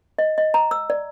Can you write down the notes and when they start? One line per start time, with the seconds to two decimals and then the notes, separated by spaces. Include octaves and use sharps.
0.18 D#5
0.38 D#5
0.54 A#5
0.71 E6
0.90 D5